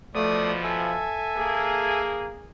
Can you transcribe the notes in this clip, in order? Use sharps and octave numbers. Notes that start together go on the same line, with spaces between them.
B2 F3 A3 D5 D#6
A4 E5 G#5
A#3 G#4